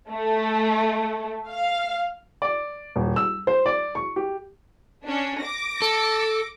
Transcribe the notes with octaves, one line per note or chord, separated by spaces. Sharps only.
A3
F5
D5
D#1
E6
C5
D5
C#6
G4
C#4 D4
D6 A#6
A4